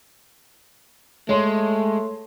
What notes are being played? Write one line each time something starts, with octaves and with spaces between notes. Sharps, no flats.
G#3 A3 C#5 C6